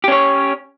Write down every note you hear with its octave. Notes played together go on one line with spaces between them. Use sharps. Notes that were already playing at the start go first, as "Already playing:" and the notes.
C#4 G4 C#5